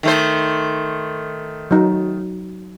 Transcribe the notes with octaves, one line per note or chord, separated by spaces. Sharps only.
D#3 A3 C5
F#3 D#4